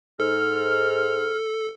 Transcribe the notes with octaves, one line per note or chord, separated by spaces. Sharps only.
G#2 A4 F6